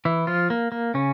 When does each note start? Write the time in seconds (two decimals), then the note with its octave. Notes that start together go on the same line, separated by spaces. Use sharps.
0.05 E3 E4
0.27 F3 F4
0.50 A#3
0.72 A#3
0.94 C#3 C#4